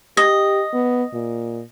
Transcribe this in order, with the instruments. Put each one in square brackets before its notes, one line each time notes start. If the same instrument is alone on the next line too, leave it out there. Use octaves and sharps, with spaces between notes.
[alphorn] G4 [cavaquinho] D#5
[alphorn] B3
A#2